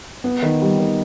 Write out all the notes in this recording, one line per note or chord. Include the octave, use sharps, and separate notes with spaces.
B3
D#3
G3
D#3